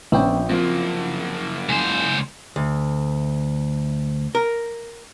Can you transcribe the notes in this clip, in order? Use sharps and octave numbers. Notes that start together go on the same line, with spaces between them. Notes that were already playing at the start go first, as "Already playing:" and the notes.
A#1 F3 B3 C#4 G5
F#2 F3 A#3 C4
C#2 C5 G#5
D2
A#4